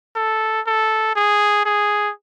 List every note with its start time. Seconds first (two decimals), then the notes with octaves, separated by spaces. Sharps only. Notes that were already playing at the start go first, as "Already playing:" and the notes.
0.16 A4
0.66 A4
1.16 G#4
1.65 G#4